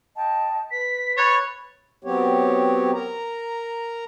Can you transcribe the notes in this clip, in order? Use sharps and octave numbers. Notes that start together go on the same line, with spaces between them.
D#5 G5 A5
B4 B6
C#5 B5 F#6 G#6 A6
F#3 B3 C4 G4 C#5
A#4 A#5